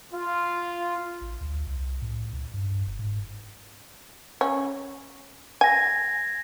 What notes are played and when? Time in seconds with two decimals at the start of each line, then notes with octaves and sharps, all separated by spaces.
0.13 F4
1.21 A1
1.41 D2
1.67 C2
2.02 A2
2.33 C#2
2.54 G2
2.87 F#1
2.99 G#2
4.41 C#4
5.61 G#5 G#6 A#6